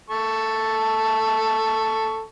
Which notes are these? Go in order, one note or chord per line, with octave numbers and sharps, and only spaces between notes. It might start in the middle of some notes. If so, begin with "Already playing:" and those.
A4 A5 C#6